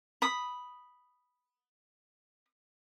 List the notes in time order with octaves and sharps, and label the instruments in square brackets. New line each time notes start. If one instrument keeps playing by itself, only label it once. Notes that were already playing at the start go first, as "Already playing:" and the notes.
[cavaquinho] B5 D#6